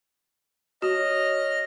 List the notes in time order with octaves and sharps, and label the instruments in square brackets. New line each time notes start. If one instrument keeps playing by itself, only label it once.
[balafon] F#4 [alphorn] C#5 [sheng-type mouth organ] D#5 F6